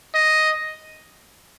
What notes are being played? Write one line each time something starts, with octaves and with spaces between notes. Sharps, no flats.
D#5